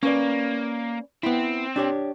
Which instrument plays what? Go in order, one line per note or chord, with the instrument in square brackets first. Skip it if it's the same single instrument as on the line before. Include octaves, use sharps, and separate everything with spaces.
[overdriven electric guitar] A#3 [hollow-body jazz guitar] C#4 B4 D5
[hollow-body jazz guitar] B3 E4 [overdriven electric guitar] C4
[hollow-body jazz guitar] D4 G4 C#5